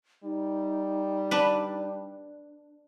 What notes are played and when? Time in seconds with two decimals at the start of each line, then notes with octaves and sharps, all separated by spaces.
0.24 G3 D#4
1.31 D4 B4